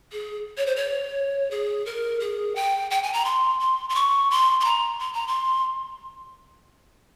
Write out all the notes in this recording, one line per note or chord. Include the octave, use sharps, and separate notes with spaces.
G#4
C#5
C5
C#5
G#4
A#4
G#4
G5
G5
G#5
A#5
C6
C6
C6
C#6
C6
C6
A#5
C6
A#5
C6